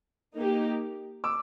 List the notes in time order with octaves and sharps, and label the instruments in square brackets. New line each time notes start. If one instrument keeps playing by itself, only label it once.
[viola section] A#3 D#4 G4
[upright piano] D6 E6